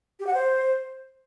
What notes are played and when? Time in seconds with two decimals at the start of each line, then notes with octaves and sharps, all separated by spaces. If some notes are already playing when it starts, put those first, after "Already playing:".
0.20 G4
0.27 F#5
0.34 C5